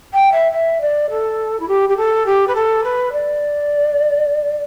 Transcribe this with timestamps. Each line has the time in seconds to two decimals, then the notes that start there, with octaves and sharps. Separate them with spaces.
0.13 G5
0.31 E5
0.51 E5
0.81 D5
1.09 A4
1.59 E4
1.68 G4
1.89 G4
1.96 A4
2.26 G4
2.47 B4
2.55 A4
2.83 B4
3.12 D5